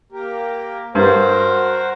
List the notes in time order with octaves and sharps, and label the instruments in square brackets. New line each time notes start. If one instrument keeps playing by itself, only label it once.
[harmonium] A#3 G4 A#4
[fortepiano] G2 [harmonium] F#4 A#4 C5